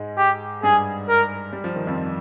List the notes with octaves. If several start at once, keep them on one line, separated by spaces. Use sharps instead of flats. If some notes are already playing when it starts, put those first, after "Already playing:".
Already playing: G#2 G#3
G4
G2 G3 G#4
A#4
G3
F3
D#3
F2 F3